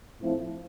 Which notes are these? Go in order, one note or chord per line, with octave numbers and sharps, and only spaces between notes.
A2 F3 A3 C4 E4